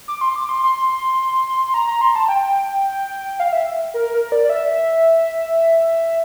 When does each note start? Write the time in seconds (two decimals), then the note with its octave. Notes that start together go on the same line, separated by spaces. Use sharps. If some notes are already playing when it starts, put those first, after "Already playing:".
0.08 D6
0.21 C6
0.36 D6
0.49 C6
0.63 C6
1.74 A#5
1.87 A#5
2.01 C6
2.16 A5
2.29 G5
3.40 F5
3.53 E5
3.94 A#4
4.14 A#4
4.32 D5
4.44 D5
4.50 E5